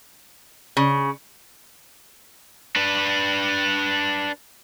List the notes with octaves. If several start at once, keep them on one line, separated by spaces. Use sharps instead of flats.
C#3
D4 B4